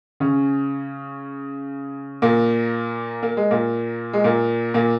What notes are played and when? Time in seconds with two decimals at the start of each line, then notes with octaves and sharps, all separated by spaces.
0.20 C#3 C#4
2.22 A#2 A#3
3.23 A#3
3.37 G#3
3.51 A#2 A#3
4.13 G#3
4.24 A#2 A#3
4.74 A#2 A#3